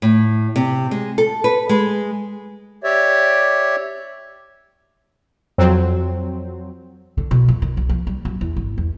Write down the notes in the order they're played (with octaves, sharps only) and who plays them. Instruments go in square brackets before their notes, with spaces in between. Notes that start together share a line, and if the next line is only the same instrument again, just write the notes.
[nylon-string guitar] A2
C3
G#3
A4
B4
G#3
[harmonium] G4 C#5 D5 E5
[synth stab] F2 F#3 C4
[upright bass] D3
B2
F2
D#3
B1
F3
G3
F#2
E2
G#1
E2